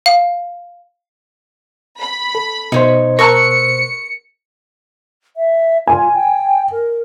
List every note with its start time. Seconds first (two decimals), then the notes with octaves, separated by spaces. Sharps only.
0.06 F5
1.99 B5
2.35 A4
2.72 B2 D#4 C5 C#5
3.19 A#4 A5 A#5 C#6 E6 F#6 C#7
5.37 E5
5.87 F4 G#5
6.14 G5
6.72 A#4